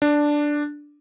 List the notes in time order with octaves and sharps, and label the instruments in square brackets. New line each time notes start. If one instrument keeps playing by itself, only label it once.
[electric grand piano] D4